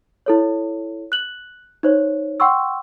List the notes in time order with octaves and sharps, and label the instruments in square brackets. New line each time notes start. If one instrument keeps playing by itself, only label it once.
[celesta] E4 A4 C#5
F#6 F#7
D#4 C5 C#5
F#5 G5 C6 C#6 E6